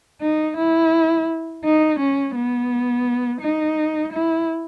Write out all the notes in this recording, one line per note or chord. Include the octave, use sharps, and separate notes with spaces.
D#4
E4
D#4
C#4
B3
D#4
E4